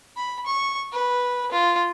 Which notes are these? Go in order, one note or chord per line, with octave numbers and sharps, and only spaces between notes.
B5
C#6
B4
F4